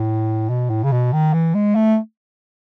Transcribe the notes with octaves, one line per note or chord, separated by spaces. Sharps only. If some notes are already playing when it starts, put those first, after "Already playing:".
Already playing: A2
B2
A2
C#3
B2
D#3
E3
G#3
A3